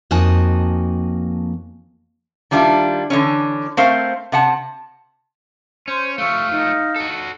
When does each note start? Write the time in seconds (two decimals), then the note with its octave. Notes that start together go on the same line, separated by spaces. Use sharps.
0.11 F2 A#3 D#4 F#4 G#5 A5
2.51 D#3 G3 D4 E4 F4
3.10 D3 E3 C#4
3.77 A3 C4 A#4 C5 F5
4.32 C3 F#5 A5
5.88 C#4 C5
6.18 F3 A3 F5 C#6 E6
6.50 D#4
6.96 F#4 A4